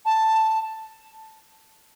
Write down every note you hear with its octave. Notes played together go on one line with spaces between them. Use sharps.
A5